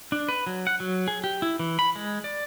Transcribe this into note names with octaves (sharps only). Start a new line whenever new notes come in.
D4
B4
F#3
F#5
F#3
G#4
G4
E4
E3
B5
G#3
D5